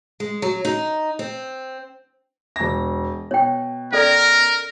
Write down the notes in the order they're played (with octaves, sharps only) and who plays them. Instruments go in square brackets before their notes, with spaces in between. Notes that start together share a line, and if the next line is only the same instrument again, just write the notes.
[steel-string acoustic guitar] G#3
F#3
D#4
C4
[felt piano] E1 A#6
[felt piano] B2 [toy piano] C#5 G5
[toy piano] C#4 A4 D5 [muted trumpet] A#4